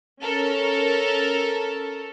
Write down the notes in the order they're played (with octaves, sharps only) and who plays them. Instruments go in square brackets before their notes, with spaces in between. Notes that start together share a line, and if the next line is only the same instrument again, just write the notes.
[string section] C#4 A4 A#4